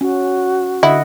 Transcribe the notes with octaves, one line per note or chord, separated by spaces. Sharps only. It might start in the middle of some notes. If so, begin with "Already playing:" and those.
C#4 F#4
D3 E4 D#5 F#5